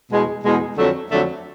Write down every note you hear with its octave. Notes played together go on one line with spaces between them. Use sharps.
E2 B2 G#3
E2 B2 G#3
F2 D3 F#3 A3
F2 D3 F#3 A3